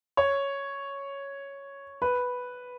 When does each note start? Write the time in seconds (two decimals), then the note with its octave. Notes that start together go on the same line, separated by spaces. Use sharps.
0.17 C#5
2.02 B4